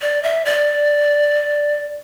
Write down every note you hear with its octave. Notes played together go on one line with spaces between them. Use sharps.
D5
E5
D5